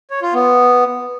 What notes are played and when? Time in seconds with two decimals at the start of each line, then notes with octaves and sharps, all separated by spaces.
0.10 C#5
0.22 F4
0.34 B3